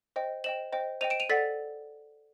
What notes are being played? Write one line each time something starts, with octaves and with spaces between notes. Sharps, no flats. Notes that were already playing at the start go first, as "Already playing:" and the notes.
C5 D#5 G5
C5 D#5 G5 E7 F#7
C5 D#5 G5
C5 D#5 G5 D#7 F7
D7 E7
D#7 F7
A4 D5 F#5 A6 B6